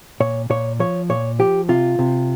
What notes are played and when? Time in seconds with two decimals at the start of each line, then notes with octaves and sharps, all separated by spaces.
0.20 A#2 C#5
0.50 A#2 C#5
0.80 F3 C#5
1.09 A#2 C#5
1.39 F3 G4
1.69 C3 F4
1.99 C3